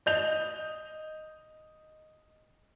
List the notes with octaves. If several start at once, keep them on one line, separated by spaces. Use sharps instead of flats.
D#5 G6 F7